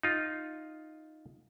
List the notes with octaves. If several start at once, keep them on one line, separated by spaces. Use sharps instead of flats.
D#4 F4